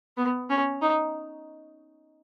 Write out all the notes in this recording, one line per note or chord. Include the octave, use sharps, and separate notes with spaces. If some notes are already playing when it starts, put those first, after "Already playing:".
B3
C#4
D#4